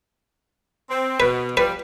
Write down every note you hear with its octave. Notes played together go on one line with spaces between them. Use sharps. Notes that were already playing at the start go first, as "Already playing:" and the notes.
C4
B2 B4
F3 G3 B4